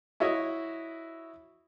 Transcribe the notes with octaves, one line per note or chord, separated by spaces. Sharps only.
E4 F#4 C#5 D#5 E5